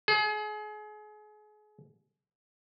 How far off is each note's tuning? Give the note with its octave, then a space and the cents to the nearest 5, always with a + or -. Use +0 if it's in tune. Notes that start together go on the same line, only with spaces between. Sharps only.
G#4 +35